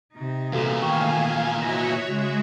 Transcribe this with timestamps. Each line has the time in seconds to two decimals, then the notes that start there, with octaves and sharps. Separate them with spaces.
0.13 C3 D#4
0.52 E2 A#2 F#4 A4 F5
0.82 D#3 A3 F5 G5 G#5 C#6
1.62 E4 F#4 C#5 D#5 E5 A#6
2.07 C#3 G#3 F#4 E5 F7